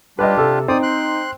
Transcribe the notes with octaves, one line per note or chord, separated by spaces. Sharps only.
G3 D4 F4 G4 B4 D#5
C3 A4
C4 D#4 D5 D#6
C6 F#6